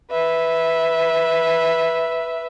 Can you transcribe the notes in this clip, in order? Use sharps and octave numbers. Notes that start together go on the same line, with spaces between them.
B4 E5